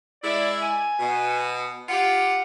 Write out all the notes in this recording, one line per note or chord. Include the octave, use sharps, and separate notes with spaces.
G#3 E4 D5
G#5
B2
F4 G4 F#5